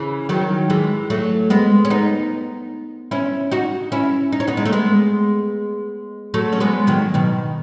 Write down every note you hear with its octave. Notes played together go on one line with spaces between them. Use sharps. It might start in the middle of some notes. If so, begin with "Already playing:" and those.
Already playing: C#3 E3
D#3 F#3
E3 G#3
F#3 A3
G#3 B3
C#4
B3 D#4
C#4 E4
D#4 F#4
C#4 E4
D#4
C#4
B3 D#4
G#3
A3
G#3 B3
F#3 A3
C#4
G#3 B3
D#3 F#3
B2 D#3